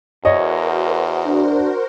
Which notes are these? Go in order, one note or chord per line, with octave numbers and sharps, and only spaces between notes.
E2 F#4 A#4 C5 C#5 D#5
D4